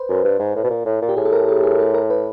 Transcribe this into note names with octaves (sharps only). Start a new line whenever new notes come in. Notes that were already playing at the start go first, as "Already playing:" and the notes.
Already playing: B4 C5
F#2
G2
G#2
A2
B2
A#2
A2
A#2
G4
A2 G#4
A4
A#4
A4
G#4
A4
A#4
B4